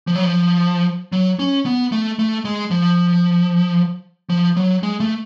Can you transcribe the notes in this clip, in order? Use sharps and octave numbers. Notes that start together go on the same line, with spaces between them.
F3
F#3
F3
F#3
C#4
B3
A3
A3
G#3
F3
F3
F#3
G#3
A3